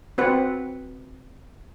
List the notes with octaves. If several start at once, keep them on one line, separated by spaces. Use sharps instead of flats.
C4 F#4 B4 F#5